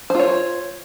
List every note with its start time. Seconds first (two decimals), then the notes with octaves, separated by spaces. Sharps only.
0.10 C5
0.15 F4
0.19 C#5